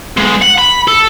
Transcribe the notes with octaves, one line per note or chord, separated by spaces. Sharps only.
B1 G#3
F#5
B5
A4